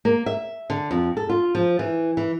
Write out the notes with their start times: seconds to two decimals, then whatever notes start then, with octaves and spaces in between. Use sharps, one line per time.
0.05 A#3
0.26 E5
0.70 D3
0.91 F2
1.17 A4
1.29 F4
1.55 F3
1.79 E3
2.17 E3